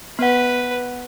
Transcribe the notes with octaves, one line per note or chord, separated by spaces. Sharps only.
B3 B4 F#5